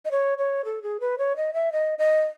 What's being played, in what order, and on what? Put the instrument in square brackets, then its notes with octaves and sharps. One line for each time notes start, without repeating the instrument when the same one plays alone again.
[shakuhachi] D#5
C#5
C#5
A4
G#4
B4
C#5
D#5
E5
D#5
D#5